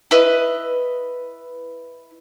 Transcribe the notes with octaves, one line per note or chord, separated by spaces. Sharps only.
E4 B4 D#5